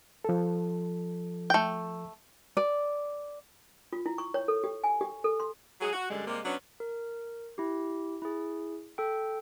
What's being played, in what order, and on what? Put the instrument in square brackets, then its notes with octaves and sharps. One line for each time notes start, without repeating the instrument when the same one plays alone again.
[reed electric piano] F3 A4
[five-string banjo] A3 G5
[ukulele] D5
[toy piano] F4
E4
C#6
C#5
A4
G4
G#5
G4
A4
C6
[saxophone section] F#3 G#4
F#4
F#2 D3 G3 G#3
C3 G3 G#3 A#3
F#3 B3 C#4 D4
[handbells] A#4
E4 G4
E4 G#4
A4 G5